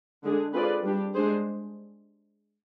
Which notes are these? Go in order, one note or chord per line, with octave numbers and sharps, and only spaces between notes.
D3 G#3 D4 G#4
C4 F4 G#4 B4 D5
G3 D4 G4
G#3 D4 G#4 C5